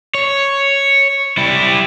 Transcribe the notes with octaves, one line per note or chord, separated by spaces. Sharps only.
C#5
G3 E4